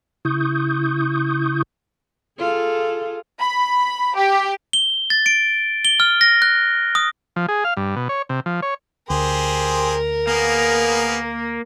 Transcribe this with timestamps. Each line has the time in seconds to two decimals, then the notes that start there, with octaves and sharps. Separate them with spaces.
0.25 C#3 E4 C#6 D#6 G6
2.38 F4 G#4 A4
3.41 B5
4.15 G4
4.73 G7
5.10 A6
5.26 D7
5.85 G7
6.00 F6
6.21 A#6
6.42 F#6
6.95 D#6
7.36 F3
7.48 G#4
7.64 F5
7.77 G2
7.96 B2
8.09 C#5
8.29 C3
8.46 F3
8.62 C#5
9.10 D2 G4 G#4 A#4 C5
10.27 A#3 B3 G#4 F5